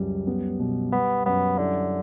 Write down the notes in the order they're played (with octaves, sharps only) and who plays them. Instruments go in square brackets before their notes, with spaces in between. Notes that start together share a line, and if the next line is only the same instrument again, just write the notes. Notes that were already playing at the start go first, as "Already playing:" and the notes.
Already playing: [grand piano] C#2 F#2 G3
B3
B2
[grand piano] G3 [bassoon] B3
[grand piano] F#2 [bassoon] B3
[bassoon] D3 [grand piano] E4